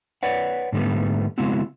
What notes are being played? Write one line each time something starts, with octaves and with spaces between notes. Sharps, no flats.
B4 C#5 D5 F#5
G#2 D3 G3 A3 B3
C#3 G#3 B3 C4 E4 F#4